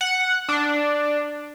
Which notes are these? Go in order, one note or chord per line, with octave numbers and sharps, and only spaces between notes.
F#5
D4